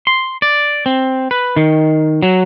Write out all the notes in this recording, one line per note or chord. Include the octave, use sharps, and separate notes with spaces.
C6
D5
C4
B4
D#3
F#3